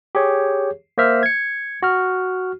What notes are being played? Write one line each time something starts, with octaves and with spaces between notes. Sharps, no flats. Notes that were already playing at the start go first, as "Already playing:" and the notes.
G4 G#4 C#5
A#3 C5 E5 F6
G#6 C#7
F#4 F6